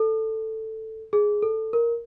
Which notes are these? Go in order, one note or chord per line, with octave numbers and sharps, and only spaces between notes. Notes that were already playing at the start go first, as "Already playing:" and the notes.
Already playing: A4
G#4
A4
A#4